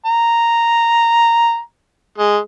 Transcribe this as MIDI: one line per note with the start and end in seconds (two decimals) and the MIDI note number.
0.06 1.59 82
2.18 2.37 56